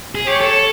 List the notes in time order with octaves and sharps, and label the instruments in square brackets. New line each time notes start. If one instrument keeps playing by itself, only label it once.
[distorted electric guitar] G#4
[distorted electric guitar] G4 [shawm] C#5
[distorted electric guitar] A4